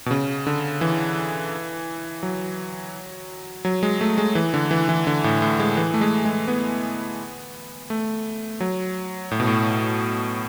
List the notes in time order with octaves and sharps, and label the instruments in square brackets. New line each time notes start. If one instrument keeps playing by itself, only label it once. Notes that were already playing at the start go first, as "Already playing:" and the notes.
[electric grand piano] B2
C#3
D3
E3
F#3
F#3
G#3
A3
G#3
E3
D3
E3
E3
D3
A2
A2
G#3
E3
A3
G#3
G#3
B3
A3
F#3
A2
B2
A2